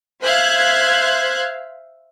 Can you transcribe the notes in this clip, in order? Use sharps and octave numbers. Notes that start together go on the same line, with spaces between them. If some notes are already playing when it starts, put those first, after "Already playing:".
C5 E5 F5 F#6 G#6